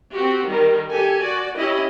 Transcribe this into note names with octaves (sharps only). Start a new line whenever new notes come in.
C4 F#4 G4
D#3 G3 A#4
G4 A4 G#5
F#4 D5
C#4 E4 G4 D#5